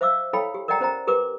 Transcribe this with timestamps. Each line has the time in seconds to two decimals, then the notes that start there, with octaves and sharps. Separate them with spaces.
0.01 C5 E5 F5 D6 E6
0.33 E4 A4 C#5 F5 G5 B5
0.54 G4
0.68 A#4 D5 D#5 F#5 G5 A#5
0.80 C#4 C5 D#5 G5 A#5
1.07 G4 A#4 B4 D6